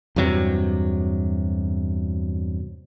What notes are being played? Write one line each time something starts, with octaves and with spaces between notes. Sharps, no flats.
E2 G2 C3 F#3